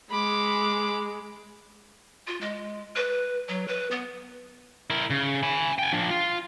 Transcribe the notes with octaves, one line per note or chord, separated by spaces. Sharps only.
G#3 B5 D6
F4
G#3
B4
F#3
B4
B3
E4 A#4
C#3
G#5 B5
G5 G#5
F3 D4
F4